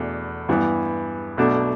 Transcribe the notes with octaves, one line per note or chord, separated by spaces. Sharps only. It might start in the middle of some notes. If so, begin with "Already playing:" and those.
Already playing: E2 B2 A3 D4
G2 E3 B3
B1 B2 A3 D4